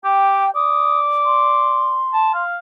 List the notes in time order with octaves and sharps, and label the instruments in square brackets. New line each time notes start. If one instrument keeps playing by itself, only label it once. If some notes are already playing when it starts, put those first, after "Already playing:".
[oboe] G4 [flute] G5
[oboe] D5 [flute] D#6
[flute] C6
[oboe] A5
F5